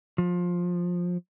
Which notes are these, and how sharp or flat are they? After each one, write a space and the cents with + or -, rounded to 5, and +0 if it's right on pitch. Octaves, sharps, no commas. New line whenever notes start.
F3 +15